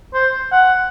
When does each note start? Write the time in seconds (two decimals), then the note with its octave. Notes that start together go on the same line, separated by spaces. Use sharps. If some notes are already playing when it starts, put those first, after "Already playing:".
0.14 C5
0.52 F#5